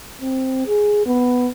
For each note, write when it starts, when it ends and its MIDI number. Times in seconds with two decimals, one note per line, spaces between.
0.21 0.63 60
0.67 1.05 68
1.06 1.49 59